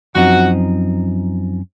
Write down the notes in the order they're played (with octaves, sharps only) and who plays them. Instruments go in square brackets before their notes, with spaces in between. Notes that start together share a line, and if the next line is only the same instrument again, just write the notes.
[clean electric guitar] F#2 F3 C4 D#4 [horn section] F#4